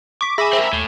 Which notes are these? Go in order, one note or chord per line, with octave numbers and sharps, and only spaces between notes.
C#6 D6 B6
G#4 E5 G#5 B5 D6 A#6
C4 A#4
D#2 A2